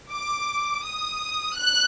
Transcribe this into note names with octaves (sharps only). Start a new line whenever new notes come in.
D6
D#6
F#6